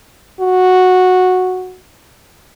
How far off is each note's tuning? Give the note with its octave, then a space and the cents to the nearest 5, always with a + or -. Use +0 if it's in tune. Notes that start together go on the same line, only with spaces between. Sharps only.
F#4 -5